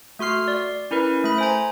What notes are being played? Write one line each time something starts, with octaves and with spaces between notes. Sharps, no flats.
A3 F#4 C6 F6 C7
D5
C#4 E4 A#4 B4
A3 B5
C5 G#5 A#5